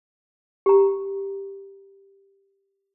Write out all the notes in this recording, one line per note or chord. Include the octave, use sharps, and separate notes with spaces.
G4 A#5